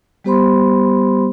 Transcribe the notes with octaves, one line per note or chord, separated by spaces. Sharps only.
G3 B3 G4 C5 B5 C6